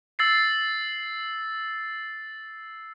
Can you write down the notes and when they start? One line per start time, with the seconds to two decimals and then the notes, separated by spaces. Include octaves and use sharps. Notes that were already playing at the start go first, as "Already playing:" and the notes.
0.19 E6 A6 C7